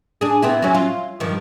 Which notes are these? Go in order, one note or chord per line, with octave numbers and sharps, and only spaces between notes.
D4 G#4
B3 C4 E4
F#3 C#4
F4
G2 D#3 F3